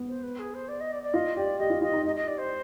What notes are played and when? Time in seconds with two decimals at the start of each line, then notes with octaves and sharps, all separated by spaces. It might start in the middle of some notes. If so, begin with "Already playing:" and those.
Already playing: B3
0.08 C5
0.23 B4
0.39 G#4
0.54 C5
0.68 D5
0.80 D#5
0.92 D5
1.02 D5
1.13 F4 D#5
1.36 G4 D5
1.59 G4 D#5
1.70 F4
1.81 F4 D#5
1.93 D#4
2.04 G4 D#5
2.15 D#5
2.27 D5
2.38 C5